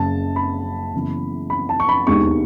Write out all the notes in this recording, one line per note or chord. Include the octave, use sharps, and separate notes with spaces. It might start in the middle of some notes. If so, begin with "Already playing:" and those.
Already playing: F#1 F#2 C#3 A5
B5
F#1 F#2 C#3 E3 B3
B5
A5
C#6
B5
E1 D#2 D#3 G#3 C#6